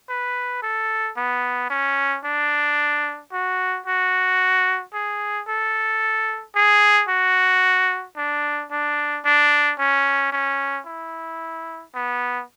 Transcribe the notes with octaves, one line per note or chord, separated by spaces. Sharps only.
B4
A4
B3
C#4
D4
F#4
F#4
G#4
A4
G#4
F#4
D4
D4
D4
C#4
C#4
E4
B3